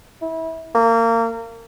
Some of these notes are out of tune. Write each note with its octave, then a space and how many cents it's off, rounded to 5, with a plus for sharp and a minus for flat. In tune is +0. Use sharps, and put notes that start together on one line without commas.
E4 -25
A#3 -25